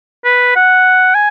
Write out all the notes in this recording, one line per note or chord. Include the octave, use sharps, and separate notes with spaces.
B4
F#5
G#5